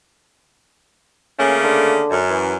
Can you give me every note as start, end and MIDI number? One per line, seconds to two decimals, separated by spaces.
1.39 2.01 49
1.39 2.01 57
1.39 2.01 58
1.39 1.54 61
1.64 2.19 50
2.11 2.56 42
2.30 2.55 52